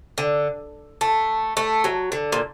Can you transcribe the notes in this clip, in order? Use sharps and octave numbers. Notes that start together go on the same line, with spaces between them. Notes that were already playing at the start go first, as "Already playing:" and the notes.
D3
A3
A3
F#3
D3
A#2